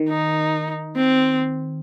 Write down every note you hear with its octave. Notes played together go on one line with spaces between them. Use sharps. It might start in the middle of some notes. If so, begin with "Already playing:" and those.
Already playing: D#3
D#4
C4